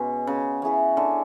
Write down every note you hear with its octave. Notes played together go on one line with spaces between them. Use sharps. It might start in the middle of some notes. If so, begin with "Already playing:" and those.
Already playing: B2 G#3 C#4 F#4 C#5
C#3
C#4 E4 G#4 B4
D3